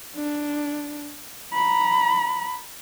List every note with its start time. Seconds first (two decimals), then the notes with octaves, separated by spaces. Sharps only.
0.15 D4
1.53 A#5 B5